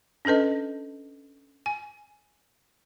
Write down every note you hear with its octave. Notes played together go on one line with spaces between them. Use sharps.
C#4 D4 A4 B4 D#5
G#5